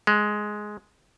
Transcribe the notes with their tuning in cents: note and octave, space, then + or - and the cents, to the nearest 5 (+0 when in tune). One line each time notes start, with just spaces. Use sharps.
G#3 +10